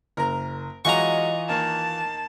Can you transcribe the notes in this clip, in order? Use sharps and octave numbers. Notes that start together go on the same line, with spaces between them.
F#1 A#4 A#5
E3 F#3 G#3 F4 F#4 D#5 A#5 C#6
D#2 D#3 A#3 A5